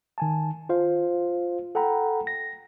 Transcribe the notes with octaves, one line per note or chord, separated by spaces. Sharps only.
D#3 G#5 A5
F4 C5 F5
A4 F#5 G5 A#5 B5
A#6